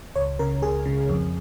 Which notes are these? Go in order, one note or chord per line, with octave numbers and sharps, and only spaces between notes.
C#2 C#5
C#3 A#4
C#2 G#4
C#3
F2